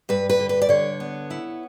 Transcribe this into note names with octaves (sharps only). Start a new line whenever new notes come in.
G2 B4
B4
D3
B4
D5
D3 C#5
B3
E4